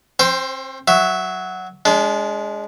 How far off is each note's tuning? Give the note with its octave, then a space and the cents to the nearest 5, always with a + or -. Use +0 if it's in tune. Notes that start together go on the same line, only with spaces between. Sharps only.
C4 +40 C5 +0 G5 +0
F#3 +0 E5 +0
G#3 +0 D4 -35